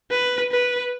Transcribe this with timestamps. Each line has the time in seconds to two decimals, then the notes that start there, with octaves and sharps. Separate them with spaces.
0.10 B4
0.51 B4